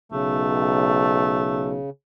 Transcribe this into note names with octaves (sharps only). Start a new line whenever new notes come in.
B1 C#3 A3